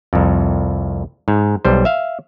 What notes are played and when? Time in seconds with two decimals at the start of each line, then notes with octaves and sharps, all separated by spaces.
0.13 C2 F2
1.28 G#2
1.65 B1 G3 C5
1.85 E5 F5